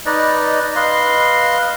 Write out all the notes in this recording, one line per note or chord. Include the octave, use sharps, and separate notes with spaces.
D#4 B4 D5 D#5
B4 D#5 F5 C6